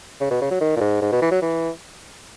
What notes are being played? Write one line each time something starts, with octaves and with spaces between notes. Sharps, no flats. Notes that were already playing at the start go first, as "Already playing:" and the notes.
C#3
B2
C#3
F#3
D#3
A#2
G#2
G#2
B2
E3
F#3
E3